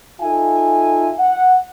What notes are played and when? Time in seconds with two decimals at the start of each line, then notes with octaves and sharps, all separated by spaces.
0.21 D#4 F4 A4 E5 G#5
1.19 F#5